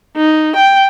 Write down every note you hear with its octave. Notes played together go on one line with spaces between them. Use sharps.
D#4
G5